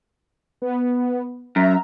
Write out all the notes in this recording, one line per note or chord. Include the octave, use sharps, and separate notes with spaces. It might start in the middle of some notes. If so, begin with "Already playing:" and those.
B3
F#2 E5 A#5